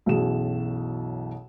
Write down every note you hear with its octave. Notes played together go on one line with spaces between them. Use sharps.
B1 F#2 B2 E3 G#4 E7